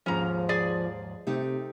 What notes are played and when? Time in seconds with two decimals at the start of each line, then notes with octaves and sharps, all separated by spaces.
0.06 D#2 G#2 F3 C#4 A#5
0.49 G#4 D5
1.27 C3 A3 D#4 G4